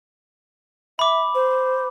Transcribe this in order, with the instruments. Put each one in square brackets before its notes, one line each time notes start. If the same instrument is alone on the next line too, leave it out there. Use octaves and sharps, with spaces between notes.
[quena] E5 [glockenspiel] B5 D6
[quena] C5